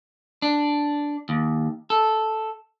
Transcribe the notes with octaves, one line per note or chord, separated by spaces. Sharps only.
D4
D#2
A4